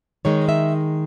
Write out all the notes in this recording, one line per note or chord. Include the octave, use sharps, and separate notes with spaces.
D#3 G#3 D#4 C#5
E5